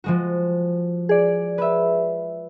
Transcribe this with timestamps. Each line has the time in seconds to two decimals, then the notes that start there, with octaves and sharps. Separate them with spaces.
0.04 F3 G#3 F#4
1.09 G#4 D5
1.58 B4 E5